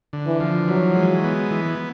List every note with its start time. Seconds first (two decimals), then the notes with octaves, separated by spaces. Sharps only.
0.13 D3
0.26 E3
0.40 F3
0.68 E3 F#3
0.95 G#3
1.24 B3
1.51 E3